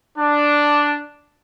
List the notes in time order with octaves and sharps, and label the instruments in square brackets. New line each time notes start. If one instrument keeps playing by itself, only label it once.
[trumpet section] D4